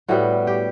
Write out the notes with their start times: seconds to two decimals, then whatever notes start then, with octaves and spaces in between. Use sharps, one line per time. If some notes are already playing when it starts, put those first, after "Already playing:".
0.08 A2 G3 B3 F#4
0.47 G4